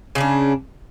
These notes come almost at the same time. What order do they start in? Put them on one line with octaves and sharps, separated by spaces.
C#3 C#4 D4